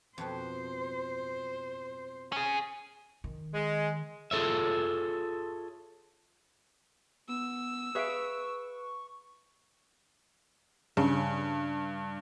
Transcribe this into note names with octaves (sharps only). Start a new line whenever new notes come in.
F2 B2 B4 C5
C#4 G#4
D#3
G#3
F4 G#4 A4 C#5 E5
B3 E6
G#4 B4 E5 F5 C#6 D7
G2 C#3